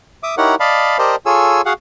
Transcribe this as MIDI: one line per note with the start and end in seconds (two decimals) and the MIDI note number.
0.23 0.35 76
0.23 0.35 86
0.23 0.35 87
0.38 0.55 63
0.38 0.55 64
0.38 0.55 67
0.38 0.55 70
0.38 0.55 73
0.38 0.55 78
0.60 0.98 74
0.60 0.98 75
0.60 0.98 77
0.60 0.98 81
0.60 0.98 83
0.98 1.16 67
0.98 1.16 70
0.98 1.16 72
0.98 1.16 74
0.98 1.16 75
0.98 1.16 81
1.26 1.61 65
1.26 1.61 68
1.26 1.61 69
1.26 1.61 73
1.26 1.61 80
1.26 1.61 88
1.66 1.73 66
1.66 1.73 68
1.66 1.73 77
1.66 1.73 78